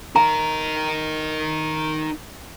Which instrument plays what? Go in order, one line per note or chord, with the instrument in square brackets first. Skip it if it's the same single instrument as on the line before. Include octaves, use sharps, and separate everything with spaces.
[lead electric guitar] D#4 A#4 [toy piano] A#5